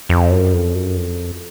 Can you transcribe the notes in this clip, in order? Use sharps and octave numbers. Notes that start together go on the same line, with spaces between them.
F2
F#2
F2
F#2
F2